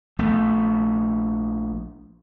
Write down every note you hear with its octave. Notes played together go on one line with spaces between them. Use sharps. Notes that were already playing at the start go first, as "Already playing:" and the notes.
A#1 A3 B3